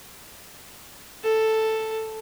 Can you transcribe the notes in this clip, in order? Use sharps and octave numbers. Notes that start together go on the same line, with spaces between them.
A4